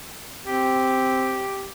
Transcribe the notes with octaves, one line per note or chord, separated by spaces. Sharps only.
C4 G4